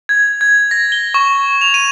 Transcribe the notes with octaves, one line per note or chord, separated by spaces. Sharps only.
G#6
G#6
A#6
G7
C#6
F7
D#7